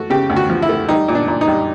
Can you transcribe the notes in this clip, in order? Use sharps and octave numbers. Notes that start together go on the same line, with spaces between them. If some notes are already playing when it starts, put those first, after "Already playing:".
Already playing: A3 F#4
C#3 G4
D2
F#4
F3
E4
A3
G3 D#4
A#2
D4
A#2
D#4
G3